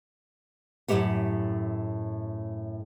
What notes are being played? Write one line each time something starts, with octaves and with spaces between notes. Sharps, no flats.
F#2 A2 C3 A3 G4 F#5